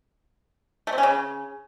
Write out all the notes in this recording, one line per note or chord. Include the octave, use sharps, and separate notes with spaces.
A3
C4
C#4
C#3